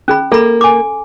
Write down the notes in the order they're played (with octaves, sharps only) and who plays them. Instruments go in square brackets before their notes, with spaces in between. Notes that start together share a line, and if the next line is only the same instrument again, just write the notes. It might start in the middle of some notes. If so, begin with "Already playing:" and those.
[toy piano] C#4 G#4 B5
[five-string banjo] A#3 [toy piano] A4 B5
[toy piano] G#5 D6